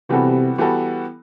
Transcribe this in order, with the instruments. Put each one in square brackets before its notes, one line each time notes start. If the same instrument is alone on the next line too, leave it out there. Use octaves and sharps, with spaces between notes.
[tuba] C3 [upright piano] E3 G3 B3 F#4 A4
[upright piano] E3 G3 B3 F#4 A4